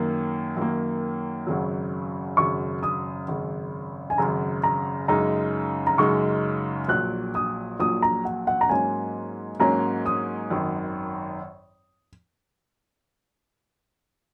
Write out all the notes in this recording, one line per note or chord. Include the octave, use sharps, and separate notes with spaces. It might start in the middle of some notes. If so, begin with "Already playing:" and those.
Already playing: F#2 D#3 A#3
F#2 D#3 A#3
G#1 F#2 C#3 F#3
G#1 F#2 C#3 F#3 C#6
D#6
G#1 F#2 C#3
G#5
G#1 F#2 C#3 A#5
A#5
F#2 C#3 G#3 D#4 A#5
A#5
F#2 C#3 G#3 D#4 C#6
A#1 A#2 F#3 F#6
D#6
A#1 A#2 F#3 D#6
A#5
F#5
F#5
A#5
G#2 F#3 A#3 C#4 G#5
G#2 F#3 A#3 C#4 A#5
D#6
G#1 F#2 D#3